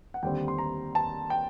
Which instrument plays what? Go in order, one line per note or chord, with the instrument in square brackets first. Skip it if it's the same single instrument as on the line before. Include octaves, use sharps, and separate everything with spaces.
[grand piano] F#5
D#2 D3 G3 C4 G5
C6
A#5
A5
G5